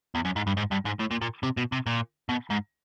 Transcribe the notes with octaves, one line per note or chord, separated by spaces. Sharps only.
E2
F#2
G#2
G2
G#2
G2
G#2
A2
A#2
A#2
C3
B2
C3
A#2
B2
G#2